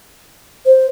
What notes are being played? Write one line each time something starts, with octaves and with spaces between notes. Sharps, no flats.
C5